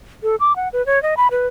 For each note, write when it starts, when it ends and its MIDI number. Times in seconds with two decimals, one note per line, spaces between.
0.23 0.36 69
0.40 0.56 86
0.56 0.69 78
0.73 0.85 71
0.86 1.01 73
1.03 1.15 75
1.17 1.28 83
1.31 1.47 71